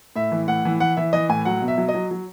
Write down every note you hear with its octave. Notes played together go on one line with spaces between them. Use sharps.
A2 E5
E3
A2 F#5
E3
E3 F#5
E3 E5
E3 D#5
A2 G#5
F#3 F#5
B2
E5
F#3
D#5
F#3
F#3